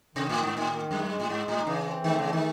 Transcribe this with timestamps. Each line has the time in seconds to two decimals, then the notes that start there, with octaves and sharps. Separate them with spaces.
0.15 C3 D#3
0.29 A2 D#3
0.43 G#2
0.54 A2 D#3
0.72 D#3
0.91 F#2 G#3
1.10 G#3
1.20 A2
1.29 G#2 G#3
1.48 A2 D#4
1.67 C#3 E3
1.86 C4
2.04 D#3 A3
2.19 C#3 E3
2.33 D#3